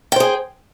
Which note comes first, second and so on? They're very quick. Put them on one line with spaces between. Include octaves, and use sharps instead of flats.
G5 C5 G#4